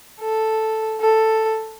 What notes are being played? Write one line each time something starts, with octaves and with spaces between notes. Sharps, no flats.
A4
A4